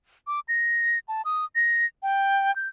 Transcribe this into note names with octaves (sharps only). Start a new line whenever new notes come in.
D6
A#6
A5
D#6
A#6
G5
G6